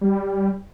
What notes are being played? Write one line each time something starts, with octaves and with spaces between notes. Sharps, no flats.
G3